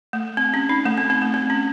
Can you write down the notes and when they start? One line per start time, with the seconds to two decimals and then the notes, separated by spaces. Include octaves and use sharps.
0.13 A3
0.37 C4
0.54 C#4
0.69 D#4
0.86 A3
0.98 C4
1.10 C4
1.22 A3
1.34 C4
1.50 C#4